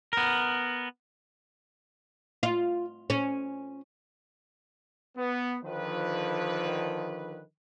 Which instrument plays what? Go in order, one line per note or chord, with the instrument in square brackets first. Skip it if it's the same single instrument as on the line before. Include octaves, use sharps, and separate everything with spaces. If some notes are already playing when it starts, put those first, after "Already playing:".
[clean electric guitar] B3 A#4
[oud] F4
C#4
[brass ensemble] B3
D3 D#3 F3 B4